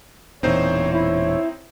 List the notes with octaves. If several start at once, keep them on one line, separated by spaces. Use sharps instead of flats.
E1 A#2 E3 C4 D#4 C5 C#5
E4 C#5